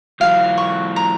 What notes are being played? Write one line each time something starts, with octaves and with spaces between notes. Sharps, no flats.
E3 F#3 F5
C#6
A#5